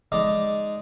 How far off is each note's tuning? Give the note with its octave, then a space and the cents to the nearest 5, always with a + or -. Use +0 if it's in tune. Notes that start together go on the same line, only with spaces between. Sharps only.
G#3 +0 D#4 +0 D5 +0